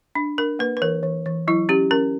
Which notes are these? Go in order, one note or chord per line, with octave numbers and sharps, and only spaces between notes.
D4
D4 A#4
A#3 B4
B4
E3 A#4
E3
E3
F#3 E4
C#4 G4
C#4 A#4